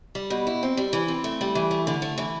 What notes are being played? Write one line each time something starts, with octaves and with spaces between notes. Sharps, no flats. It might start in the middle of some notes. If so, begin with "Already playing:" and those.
G3
B2
E4
C4
G3
E3
C4
A3
G3
E3
A3
D3
A3
E3